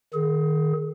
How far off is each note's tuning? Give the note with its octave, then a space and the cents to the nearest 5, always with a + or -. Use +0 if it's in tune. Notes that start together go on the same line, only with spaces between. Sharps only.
D#3 -5 G#4 +25